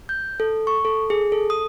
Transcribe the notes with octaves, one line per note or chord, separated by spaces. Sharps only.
G6
A4
C#6
A4
G#4
A4
D#6